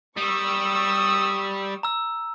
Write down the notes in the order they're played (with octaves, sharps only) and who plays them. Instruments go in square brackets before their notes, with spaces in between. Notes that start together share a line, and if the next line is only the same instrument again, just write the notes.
[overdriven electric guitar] G3 [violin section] C#6 E6 [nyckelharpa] D#6
[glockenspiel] A#5 E6